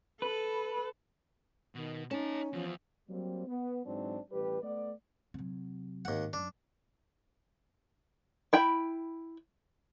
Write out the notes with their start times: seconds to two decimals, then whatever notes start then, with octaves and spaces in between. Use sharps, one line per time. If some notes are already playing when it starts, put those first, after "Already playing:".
0.22 A4 B4
1.75 B2 D#3
2.11 C#4 D#4 C#5 A5
2.53 E2 F3
3.08 F#3 G3 A#3 C4
3.47 B3
3.85 G#2 E3 F#3 C4 D4
4.30 A1 G3 G4 B4
4.62 A3 B3 D5
5.34 C3 F#3
6.05 G#1 D#2 F#5
6.33 F#2 D4
8.53 E4 G5 B5